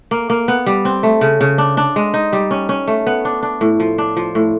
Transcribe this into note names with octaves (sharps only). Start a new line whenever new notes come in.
A#3
A#3
B3
G3
C4
A3
C#3
C#3
D4
D4
G#3
D#4
G3
C#4
C#4
A3
B3
D4
D4
A2
F3
D4
F3
A2